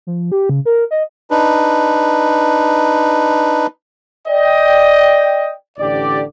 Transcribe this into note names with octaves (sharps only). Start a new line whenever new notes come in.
F3
G4
C#3
A#4
D#5
D4 D#4 B4
D5 D#5 G5
A1 D3 G4 D5